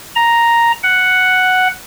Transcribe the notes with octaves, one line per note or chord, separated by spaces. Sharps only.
A#5
F#5